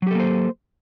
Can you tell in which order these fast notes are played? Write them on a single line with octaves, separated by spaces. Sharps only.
F#3 G4 A4 A#3 C5